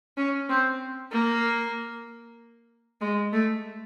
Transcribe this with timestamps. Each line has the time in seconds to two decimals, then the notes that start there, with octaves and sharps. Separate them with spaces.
0.17 C#4
0.49 C4
1.12 A#3
3.01 G#3
3.33 A3